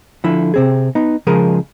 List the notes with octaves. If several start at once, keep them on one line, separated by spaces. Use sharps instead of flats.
D3 F3 E4
C3 C4 G#4
B3 D#4
C#3 F3 G#3 G#4 A#4